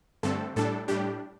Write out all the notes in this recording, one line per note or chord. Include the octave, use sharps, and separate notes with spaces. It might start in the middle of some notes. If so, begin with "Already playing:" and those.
G2 D3 A3 C4 A4
A2 G3 D4 A4
A2 G3 D4 G4